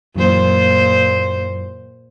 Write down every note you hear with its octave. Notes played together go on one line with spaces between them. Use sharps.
F#2 A#2 E3 F#3 C5